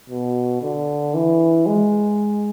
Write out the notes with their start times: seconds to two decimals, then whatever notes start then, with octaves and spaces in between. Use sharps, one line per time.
0.09 B2
0.62 D3
1.14 E3
1.66 G#3